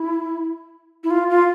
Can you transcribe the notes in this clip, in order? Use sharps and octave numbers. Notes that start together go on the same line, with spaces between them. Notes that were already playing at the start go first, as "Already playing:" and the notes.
Already playing: E4
E4
F4
F4